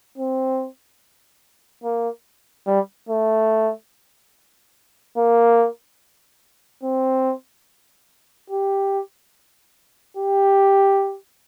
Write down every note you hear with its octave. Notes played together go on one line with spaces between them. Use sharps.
C4
A#3
G3
A3
A#3
C4
G4
G4